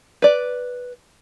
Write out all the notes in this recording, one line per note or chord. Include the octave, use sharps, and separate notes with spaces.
B4 D5